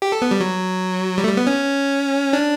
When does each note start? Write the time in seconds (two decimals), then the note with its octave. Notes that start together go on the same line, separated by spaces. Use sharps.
0.02 G4
0.12 A4
0.22 B3
0.31 G3
0.41 F#3
1.18 G3
1.24 A3
1.28 G3
1.37 B3
1.47 C#4
2.33 D4